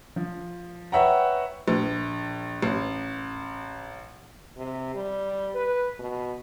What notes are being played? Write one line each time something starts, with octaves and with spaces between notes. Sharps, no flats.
F3
B4 C#5 E5 F#5 G5 A#5
A#1
A1
C3
G3
B4
B2